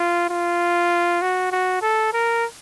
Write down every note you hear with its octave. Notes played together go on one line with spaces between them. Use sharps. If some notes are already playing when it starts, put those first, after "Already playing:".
Already playing: F4
F4
F#4
F#4
A4
A#4